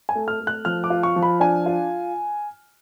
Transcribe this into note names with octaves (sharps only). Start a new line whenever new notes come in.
G#5
A3
F6
A3
F#6
F3 F6
D6
F4
C#6
F3
B5
D4 G#5
F4